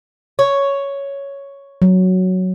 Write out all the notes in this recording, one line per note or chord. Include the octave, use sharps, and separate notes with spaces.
C#5
F#3